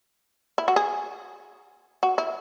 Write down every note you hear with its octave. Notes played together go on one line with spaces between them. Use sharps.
E4
F#4
G#4
F#4
E4